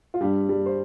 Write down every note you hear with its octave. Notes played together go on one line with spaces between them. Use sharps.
F4
G2 G3 G4
G3
C5